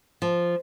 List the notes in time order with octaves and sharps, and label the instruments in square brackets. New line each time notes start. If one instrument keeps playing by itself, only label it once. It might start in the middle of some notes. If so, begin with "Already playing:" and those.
[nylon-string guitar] F3